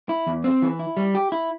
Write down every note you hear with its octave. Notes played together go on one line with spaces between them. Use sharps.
E4
E2
C4
E3
E4
G3
G4
E4